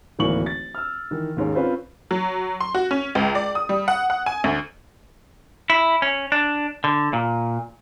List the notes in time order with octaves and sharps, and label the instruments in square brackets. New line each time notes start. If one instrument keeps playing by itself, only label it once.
[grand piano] D1 G#1 E3 A#3 C#6 F#7
A6
E6 F6
D#3 E3
D#2 G#2 C#4
C4 C#4 F4 B4 C5
[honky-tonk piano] F#3
C6
F#4
C#4
C#2
D5
D#6
G3
F#5
F#5
G#5
D2
[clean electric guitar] E4
C#4
D4
D3
A#2